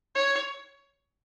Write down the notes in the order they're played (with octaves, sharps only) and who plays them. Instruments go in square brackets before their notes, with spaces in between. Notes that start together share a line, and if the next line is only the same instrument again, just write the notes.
[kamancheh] C#5